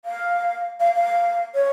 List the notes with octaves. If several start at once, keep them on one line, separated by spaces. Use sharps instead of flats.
F5
F5
F5
C#5